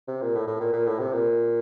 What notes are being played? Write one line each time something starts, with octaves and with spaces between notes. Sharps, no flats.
C3
A#2
A2
A2
A#2
A#2
A2
C3
A#2